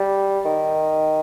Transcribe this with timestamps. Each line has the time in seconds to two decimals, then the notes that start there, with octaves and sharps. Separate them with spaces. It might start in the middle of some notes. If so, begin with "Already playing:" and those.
Already playing: G3
0.46 D#3